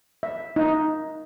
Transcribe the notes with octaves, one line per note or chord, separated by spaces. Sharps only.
E5
D#4